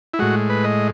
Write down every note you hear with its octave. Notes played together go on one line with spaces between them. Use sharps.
E4
A2 G#3 F#4
B4
D#5